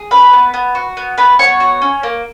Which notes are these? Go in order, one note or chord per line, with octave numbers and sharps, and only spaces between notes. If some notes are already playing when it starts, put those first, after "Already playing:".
Already playing: G#4
C#4 B4 B5
B3
B3
F#4
B3
B3 B4 B5
B3 C#5 C#6
F#4
C#4
A#3